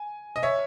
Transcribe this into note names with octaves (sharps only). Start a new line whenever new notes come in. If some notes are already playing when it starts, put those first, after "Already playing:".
Already playing: G#5
D#5
C#5 E5